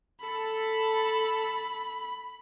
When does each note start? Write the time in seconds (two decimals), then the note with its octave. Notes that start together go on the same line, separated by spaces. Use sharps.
0.22 A4 B5